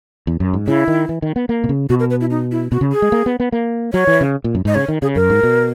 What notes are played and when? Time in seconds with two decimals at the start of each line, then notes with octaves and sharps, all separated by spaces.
0.27 E2
0.40 F#2
0.54 G#2
0.67 C#3 E4
0.88 D#3
1.09 E3
1.22 D#3
1.36 B3
1.49 A#3
1.64 B2
1.69 C#3
1.89 B2 F#4
2.00 A#4
2.10 B4
2.21 E4
2.30 D#4
2.51 E4
2.72 B2 F#4
2.81 C#3
2.92 G#4
3.02 G#3
3.12 A#3
3.26 B3
3.40 B3
3.52 A#3
3.93 F#3 C#5
4.07 E3
4.21 C#3
4.44 A#2
4.55 F#2
4.65 G#2 D#5
4.75 C#3 C#5
4.88 D#3
5.02 C#3 G#4
5.15 F#2 A#4
5.30 G#2
5.43 B2